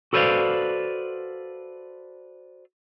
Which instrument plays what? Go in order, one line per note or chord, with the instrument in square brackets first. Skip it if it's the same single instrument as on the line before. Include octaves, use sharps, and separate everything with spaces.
[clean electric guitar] F#4 A4 B4 C5 D5 F5